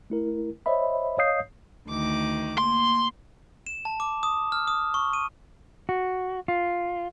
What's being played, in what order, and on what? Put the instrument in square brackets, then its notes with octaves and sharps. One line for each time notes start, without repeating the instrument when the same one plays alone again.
[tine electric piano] A3 E4 A#4
C5 C#5 D#5 E5 B5
C#5 D#5 F5 D#6 G6 C7
[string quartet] D2 D#3 D6
[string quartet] A#3 [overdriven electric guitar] C6
[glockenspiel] E7
A5
D6
D#6
F6
D#6
C#6
D#7
[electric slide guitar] F#4
F4